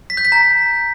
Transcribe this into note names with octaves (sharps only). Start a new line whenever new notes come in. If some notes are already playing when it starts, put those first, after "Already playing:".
B6
G6
B6
A#5